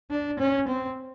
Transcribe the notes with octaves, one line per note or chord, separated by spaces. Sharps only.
D4
C#4
C4